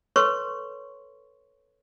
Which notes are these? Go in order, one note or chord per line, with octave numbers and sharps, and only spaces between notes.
A4 B4 C#5 C6 C#6